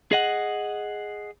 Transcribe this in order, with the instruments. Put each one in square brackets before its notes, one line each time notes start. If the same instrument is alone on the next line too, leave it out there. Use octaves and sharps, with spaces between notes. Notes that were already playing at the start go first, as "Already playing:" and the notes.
[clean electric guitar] G#4 D#5 F#5